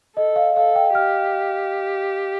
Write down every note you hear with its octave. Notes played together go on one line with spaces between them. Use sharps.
A4 D#5
F5
A4 F5
G5
G4 F6